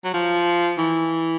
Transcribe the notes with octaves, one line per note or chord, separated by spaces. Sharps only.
F#3
F3
E3